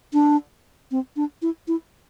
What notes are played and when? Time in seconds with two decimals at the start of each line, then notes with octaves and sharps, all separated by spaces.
0.13 D4
0.91 C4
1.16 D4
1.42 E4
1.68 E4